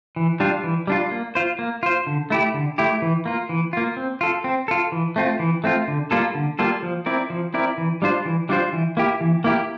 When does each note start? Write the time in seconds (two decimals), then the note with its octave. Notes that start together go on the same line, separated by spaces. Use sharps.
0.16 E3
0.40 G3 D4 F4
0.64 E3
0.87 G3 D4 F4
1.11 A#3
1.35 F4 C5
1.59 A#3
1.83 F4 C5
2.07 D3
2.30 A3 E4 G4
2.54 D3
2.78 A3 E4 G4
3.02 E3
3.26 A#3 F4
3.49 E3
3.73 A#3 F4
3.97 C4
4.21 F4 A4
4.44 C4
4.68 F4 A4
4.92 E3
5.16 A3 C4 F4
5.39 E3
5.64 A3 C4 F4
5.88 D3
6.11 G3 A#3 F4 A4
6.35 D3
6.59 G3 A#3 F4 A4
6.83 F3
7.06 C4 E4 A#4 D5
7.30 F3
7.54 C4 E4 A#4 D5
7.78 E3
8.02 G3 D4 F4 C5
8.25 E3
8.49 G3 D4 F4 C5
8.73 E3
8.97 A#3 E4 G4
9.21 E3
9.44 A#3 E4 G4